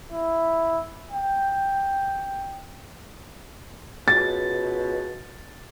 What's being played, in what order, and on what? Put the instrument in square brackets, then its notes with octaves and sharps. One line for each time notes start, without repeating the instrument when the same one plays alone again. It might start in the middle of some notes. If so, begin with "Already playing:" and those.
[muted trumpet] E4
G5
[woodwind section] C#2 B2 [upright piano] A6